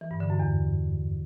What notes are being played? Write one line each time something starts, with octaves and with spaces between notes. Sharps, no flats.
E3
G2
D3
F#2
E2